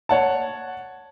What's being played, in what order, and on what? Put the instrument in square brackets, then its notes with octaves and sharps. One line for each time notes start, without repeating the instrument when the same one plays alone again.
[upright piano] C#5 F#5 A5